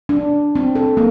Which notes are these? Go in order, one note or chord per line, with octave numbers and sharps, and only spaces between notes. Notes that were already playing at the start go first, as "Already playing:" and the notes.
D4
C4
A4
A#3